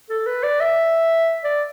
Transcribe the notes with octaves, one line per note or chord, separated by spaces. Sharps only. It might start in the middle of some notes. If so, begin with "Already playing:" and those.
A4
B4
D5
E5
D5